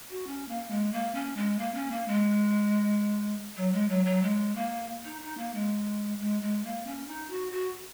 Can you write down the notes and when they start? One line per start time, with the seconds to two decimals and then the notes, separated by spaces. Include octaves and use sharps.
0.10 F#4
0.27 C#4
0.49 A#3
0.70 G#3
0.93 A#3
1.15 C#4
1.37 G#3
1.59 A#3
1.74 C#4
1.91 A#3
2.08 G#3
3.57 F#3
3.73 G#3
3.89 F#3
4.05 F#3
4.23 G#3
4.55 A#3
5.05 D#4
5.22 D#4
5.38 A#3
5.54 G#3
6.20 G#3
6.42 G#3
6.65 A#3
6.87 C#4
7.08 D#4
7.30 F#4
7.52 F#4